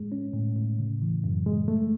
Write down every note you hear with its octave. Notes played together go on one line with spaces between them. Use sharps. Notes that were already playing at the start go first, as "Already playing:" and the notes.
Already playing: G#3
C#4
A2
A2
C#3
E3
F#2
G#3
A3